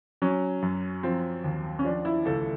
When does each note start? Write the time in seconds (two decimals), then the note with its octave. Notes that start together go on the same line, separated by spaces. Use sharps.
0.22 F#3 C#4
0.62 F#2
1.03 F3 C4
1.44 D#2
1.79 C#4
1.84 F3 D4
2.05 E4
2.25 C#2 A4